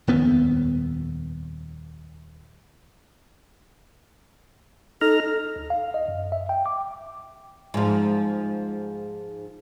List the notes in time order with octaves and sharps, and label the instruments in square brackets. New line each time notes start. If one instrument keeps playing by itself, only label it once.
[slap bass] D#1 F2 B3
[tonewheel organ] D#4 A#5 F6 [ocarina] A4
[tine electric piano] D2
F5
D#5
F#2
E5
G5
D6
[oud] G#2 F3